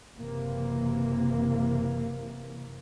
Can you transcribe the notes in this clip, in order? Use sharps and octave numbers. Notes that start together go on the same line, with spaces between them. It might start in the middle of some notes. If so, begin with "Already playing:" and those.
F#1 C3 E3 A#3